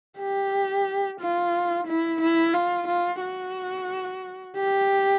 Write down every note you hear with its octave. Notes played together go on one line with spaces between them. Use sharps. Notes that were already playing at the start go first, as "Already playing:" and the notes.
G4
F4
E4
E4
F4
F4
F#4
G4